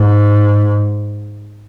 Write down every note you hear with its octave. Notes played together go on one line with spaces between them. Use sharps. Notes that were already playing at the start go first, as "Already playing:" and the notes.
Already playing: G#2